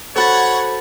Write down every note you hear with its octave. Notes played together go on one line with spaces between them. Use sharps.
F#4 A4 C5 C#5 F#5 B5 A6